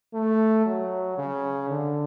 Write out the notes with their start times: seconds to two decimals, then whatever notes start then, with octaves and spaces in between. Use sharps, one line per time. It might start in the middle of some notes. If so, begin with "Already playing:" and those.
0.13 A3
0.66 F#3
1.18 C#3
1.70 D3